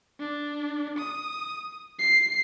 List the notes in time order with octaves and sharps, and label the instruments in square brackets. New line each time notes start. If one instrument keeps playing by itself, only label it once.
[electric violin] D4
D#6
C7